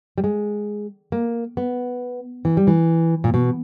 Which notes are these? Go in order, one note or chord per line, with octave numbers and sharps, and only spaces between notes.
G3
G#3
A#3
B3
E3
G3
E3
A#2
B2